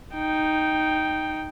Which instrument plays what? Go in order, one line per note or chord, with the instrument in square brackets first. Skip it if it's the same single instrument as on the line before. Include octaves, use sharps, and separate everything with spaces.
[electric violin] D#4 G5